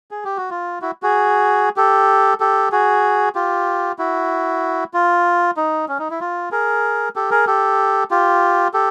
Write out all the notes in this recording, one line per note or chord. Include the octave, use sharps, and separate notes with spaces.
G#4
G4
F#4
F4
E4 F#4
F#4 G#4
G4 A4
G4 A4
F#4 G#4
F4 G4
E4 F#4
F4
D#4
C#4
D#4
E4
F4
G#4 A#4
G4 A4
G#4 A#4
G4 A4
F4 G4
G4 A4